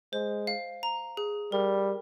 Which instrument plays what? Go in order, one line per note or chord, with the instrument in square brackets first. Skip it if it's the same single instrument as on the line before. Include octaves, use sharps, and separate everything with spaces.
[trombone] G#3 [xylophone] C5
[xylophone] F5
A#5
G#4
[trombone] G3 [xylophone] A#4